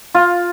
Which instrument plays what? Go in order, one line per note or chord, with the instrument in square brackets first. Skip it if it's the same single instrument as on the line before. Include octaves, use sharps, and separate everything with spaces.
[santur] F4